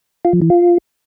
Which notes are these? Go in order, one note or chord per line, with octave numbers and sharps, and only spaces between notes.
F4
F3
E3
F4